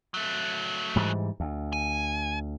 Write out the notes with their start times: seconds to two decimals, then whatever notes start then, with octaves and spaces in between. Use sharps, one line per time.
0.14 F#3 A3
0.96 G#2 E3 G3
1.40 D2
1.73 G#5